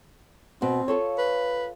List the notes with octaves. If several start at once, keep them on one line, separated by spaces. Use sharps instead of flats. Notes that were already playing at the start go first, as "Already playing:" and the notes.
B2 C4
F4 A4 C#5
B4